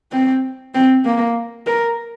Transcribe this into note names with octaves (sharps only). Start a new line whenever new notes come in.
C4
C4
A#3
A#4